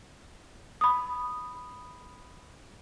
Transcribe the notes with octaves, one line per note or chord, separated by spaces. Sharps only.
B5 D#6